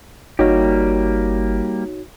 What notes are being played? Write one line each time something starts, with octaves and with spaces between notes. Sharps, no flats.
G1 G3 A#3 D#4 F#4 G4 C#5